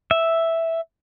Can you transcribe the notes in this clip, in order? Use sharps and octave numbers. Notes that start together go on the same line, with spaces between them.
E5